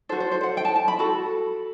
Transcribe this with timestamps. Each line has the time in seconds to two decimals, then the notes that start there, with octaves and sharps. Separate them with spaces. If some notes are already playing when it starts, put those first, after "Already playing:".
0.09 A4 C5
0.12 F#4
0.20 C5
0.31 C5
0.43 F#5
0.57 G5
0.65 A5
0.76 A5
0.88 B5
0.99 F#4 A4